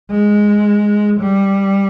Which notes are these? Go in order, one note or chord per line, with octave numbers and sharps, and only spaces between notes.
G#3
G3